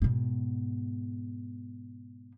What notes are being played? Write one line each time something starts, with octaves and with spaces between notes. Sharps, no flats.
G#2 B2